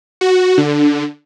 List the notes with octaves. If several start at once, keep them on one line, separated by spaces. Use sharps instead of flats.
F#4
D3